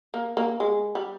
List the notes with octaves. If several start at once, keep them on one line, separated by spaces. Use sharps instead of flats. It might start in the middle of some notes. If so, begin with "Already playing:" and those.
A#3
A#3
G#3
G3